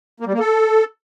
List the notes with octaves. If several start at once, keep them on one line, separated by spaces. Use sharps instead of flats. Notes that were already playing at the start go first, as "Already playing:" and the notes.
A#3
G3
A#3
A4